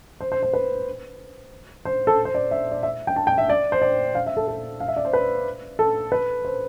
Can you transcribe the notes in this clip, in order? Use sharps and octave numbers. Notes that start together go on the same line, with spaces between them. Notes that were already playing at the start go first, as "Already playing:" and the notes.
C5
C5
C5
B4
C5
A4
C5
D5
E5
D5
E5
G5
A5
G5
E5
D5
C5
D5
F5
E5
A4
A4
F5
E5
D5
C5
B4
A4
B4
C5